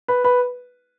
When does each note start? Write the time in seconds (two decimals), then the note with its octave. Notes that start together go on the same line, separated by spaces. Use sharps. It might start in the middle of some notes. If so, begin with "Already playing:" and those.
0.08 B4
0.24 B4